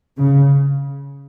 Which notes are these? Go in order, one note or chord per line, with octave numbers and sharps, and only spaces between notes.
C#3